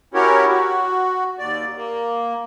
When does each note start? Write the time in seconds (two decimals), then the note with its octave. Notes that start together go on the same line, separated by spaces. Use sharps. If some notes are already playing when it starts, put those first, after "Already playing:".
0.14 C#4 E4 F#4 G4 A#4 C#5
0.49 F#4
1.39 D#2 D5
1.76 A#3